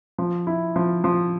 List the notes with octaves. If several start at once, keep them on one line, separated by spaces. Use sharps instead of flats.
F3
E4
F3
F3